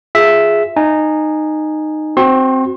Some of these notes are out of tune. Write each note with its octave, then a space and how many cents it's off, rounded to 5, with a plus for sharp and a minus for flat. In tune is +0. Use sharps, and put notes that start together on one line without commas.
F4 +0 G#4 +0 E5 +0
D#4 -15 G#5 +0
C4 +0 F#4 +0 C6 +40